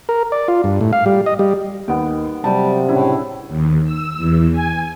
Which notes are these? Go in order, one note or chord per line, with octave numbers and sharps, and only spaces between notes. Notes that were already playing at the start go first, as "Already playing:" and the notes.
A#4
D5
F4
G2
A2
F5
G3
D#5
G3
D#2 D#3 B3 G5
C3 F#3 G3 A5
A2 C#3 D4 E4
D#2
E6
E2
G#5